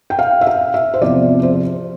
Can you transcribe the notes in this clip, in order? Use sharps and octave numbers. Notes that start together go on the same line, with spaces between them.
G5
F5
E5
F5
E5
C5
E2 C3 F3 D5
C5